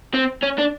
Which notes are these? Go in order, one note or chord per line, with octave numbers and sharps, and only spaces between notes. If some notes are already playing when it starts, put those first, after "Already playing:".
C4
C#4
D4